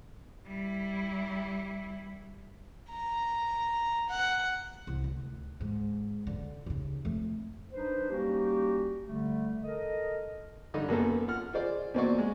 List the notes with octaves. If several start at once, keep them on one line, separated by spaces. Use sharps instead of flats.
G3 E4
A#5
F#5
C2
D2
G#2
D3
D#2 C#3
F2 A3
F#3 D4 D#4 B4 C5
G3 A#3 C#4 D#4 F#4 G4
D3 G3 A3
A4 A#4 D#5
G2 D3 D#4 D#5
F#2 A#3 B3 A4
F4 F#5 F6
F4 G#4 C5 D5
E2 A#2 C4 F#4 D5 C#6
G#3